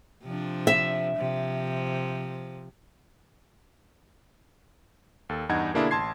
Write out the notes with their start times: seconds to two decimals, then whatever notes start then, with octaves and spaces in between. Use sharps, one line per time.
0.23 C3 F3 D4
0.67 E5
1.16 C3 F3
5.29 D#2 A4
5.49 E2 G2 D#4 F#5 G#6
5.74 B2 D3 A#3 D4 E4 G#4
5.91 A1 A5 C6 G#6 C7